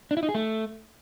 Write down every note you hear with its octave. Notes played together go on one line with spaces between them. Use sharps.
D4
E4
D#4
G#4
A3